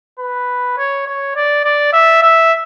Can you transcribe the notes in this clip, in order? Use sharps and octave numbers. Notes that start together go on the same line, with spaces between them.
B4
C#5
C#5
D5
D5
E5
E5